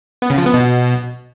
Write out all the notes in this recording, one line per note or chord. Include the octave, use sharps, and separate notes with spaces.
B3
C#3
F3
B3
B2